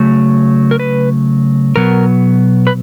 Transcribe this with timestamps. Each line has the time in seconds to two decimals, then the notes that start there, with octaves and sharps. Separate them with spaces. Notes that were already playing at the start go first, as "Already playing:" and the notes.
Already playing: C#3 F#3 A3
0.71 A#4
0.79 B4
1.76 B2 F#3 B3 A#4
2.67 B4